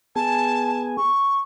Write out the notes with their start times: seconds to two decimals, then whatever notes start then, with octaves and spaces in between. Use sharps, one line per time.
0.16 B3 G#4 G#5 A5
0.97 C#6